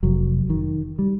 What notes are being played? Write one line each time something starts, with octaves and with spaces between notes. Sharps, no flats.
F1 F#3
D#3
G3